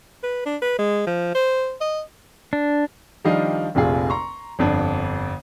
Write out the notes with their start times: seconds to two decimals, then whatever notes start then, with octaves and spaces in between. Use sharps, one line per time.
0.23 B4
0.46 D4
0.62 B4
0.79 G#3
1.07 F3
1.35 C5
1.81 D#5
2.53 D4
3.24 D#3 F3 G3 D4 D#5 F5
3.75 F1 A#1 C3 F4 G#4
4.10 A#5 C6 C#6
4.59 G1 F2 D4